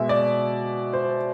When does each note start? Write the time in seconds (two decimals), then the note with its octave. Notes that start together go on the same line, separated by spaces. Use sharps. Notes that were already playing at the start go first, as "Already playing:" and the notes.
Already playing: B2 G#3 E5
0.09 D5
0.93 C5